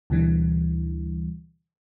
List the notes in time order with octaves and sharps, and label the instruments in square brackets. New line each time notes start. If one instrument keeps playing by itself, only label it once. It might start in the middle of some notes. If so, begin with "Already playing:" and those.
[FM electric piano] D2 B2 D3 E3 G3